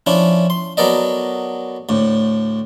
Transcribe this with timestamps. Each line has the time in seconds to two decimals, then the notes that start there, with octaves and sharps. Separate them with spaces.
0.06 F3 C#4 D4 E4
0.50 C6
0.77 F#3 B3 A4 A#4 D5 D#5
1.89 D2 A2